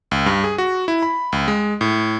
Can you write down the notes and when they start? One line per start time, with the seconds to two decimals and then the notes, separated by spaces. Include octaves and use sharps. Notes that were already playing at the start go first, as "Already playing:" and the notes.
0.11 C#2
0.26 G2
0.44 G#4
0.58 F#4
0.88 E4
1.03 B5
1.32 C#2
1.48 G#3
1.81 A2